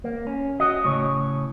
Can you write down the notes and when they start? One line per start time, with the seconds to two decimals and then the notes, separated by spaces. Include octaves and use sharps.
0.04 A#3
0.27 C#4
0.60 F#4 D#5
0.84 A2 C#3 C#5